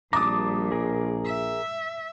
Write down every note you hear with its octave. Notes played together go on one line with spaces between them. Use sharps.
A#1 A#2 G3 A5 A#5 D6 D#6
G#4 A#4
E5